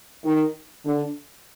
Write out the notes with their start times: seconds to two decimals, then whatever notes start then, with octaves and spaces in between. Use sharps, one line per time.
0.25 D#3
0.85 D3